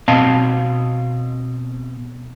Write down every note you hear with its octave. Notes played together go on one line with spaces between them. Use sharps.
B2 C4 D#5 F5 A5